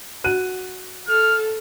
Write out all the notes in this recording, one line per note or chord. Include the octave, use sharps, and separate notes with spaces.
F#4 F#6 D#7
A4 F6